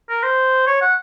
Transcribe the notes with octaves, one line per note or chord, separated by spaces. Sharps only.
A#4
C5
C#5
F#5